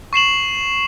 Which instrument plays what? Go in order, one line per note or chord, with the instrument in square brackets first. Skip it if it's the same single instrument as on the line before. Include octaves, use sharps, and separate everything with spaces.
[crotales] C#6 C7 E7 F#7